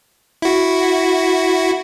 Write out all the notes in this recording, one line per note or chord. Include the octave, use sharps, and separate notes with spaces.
E4 F#4